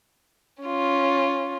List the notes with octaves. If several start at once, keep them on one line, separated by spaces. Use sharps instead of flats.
C#4 F4